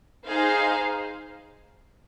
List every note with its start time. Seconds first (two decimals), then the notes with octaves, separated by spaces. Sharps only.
0.25 D#4 G#4 C5 F5